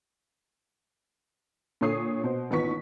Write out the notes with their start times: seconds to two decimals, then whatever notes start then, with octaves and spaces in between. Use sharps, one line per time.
1.81 A#2 D3 A4 C#5 D#6 C7
2.24 B2 C5
2.51 A1 D#2 B3 F4 C#6 B6